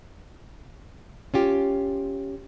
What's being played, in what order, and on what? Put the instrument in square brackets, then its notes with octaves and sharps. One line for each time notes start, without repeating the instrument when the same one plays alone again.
[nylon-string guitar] C#4 F4 G4